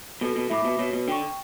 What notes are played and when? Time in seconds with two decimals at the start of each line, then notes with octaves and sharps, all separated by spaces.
0.21 B2 A4
0.36 B2
0.50 A2 E5 B5 D6
0.65 B2
0.79 B2 C#5
0.93 B2
1.08 D3 G5 C#6